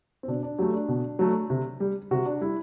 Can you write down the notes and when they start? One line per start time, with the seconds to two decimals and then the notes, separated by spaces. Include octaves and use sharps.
0.23 C4
0.28 B2 D4
0.43 D4
0.59 F#3 A3 G4
0.74 D4
0.88 B2
1.19 F#3 A3
1.50 C3
1.80 G3
2.11 C3 F#4
2.26 D4
2.41 G3 E4